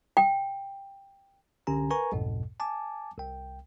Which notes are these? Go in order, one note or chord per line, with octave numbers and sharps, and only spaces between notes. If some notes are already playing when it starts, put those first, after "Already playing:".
G5
C2 D3 C#4 G4 G#5 A#5
A#4 B4 G#5 A#5 C#6
B1 F2 G#2 B2
G#5 A5 D6
C2 G5